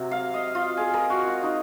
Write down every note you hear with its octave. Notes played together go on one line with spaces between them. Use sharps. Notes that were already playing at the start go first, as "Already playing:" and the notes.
Already playing: C3 F#3
F5
D#5
F4
G#4
A#4
F#4
F4
D#4